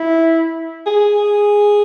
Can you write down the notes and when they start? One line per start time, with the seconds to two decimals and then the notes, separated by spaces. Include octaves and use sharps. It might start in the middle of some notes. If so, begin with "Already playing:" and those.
Already playing: E4
0.86 G#4